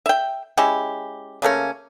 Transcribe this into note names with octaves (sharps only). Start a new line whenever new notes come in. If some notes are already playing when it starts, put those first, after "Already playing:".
E5 G5
G#3 C#4 E4 G4
C#3 A3 A#3 C#4